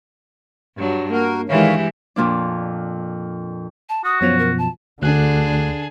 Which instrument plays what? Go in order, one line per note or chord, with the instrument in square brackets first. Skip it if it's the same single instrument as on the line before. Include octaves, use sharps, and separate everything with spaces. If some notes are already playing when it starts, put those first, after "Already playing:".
[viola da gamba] G2 F#3 D4
[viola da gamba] A#3 [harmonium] F#4 A#4
[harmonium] D#3 C#5 F5 [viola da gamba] E3 G#3 G4
[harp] F2 A#2 A#3 D4
[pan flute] A5
[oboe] F#4 [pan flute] D#6
[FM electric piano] F#2 B2 F3 [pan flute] C#5
[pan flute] A#4
A5
[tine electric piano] D2 F#6 [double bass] D3 [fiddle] D4 G#4